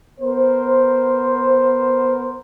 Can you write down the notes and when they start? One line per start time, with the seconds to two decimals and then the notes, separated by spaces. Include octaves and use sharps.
0.20 B3 A#4 C5